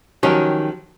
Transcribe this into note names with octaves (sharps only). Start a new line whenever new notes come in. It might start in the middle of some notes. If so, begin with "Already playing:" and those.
D#3 F3 F#3 C#4 G4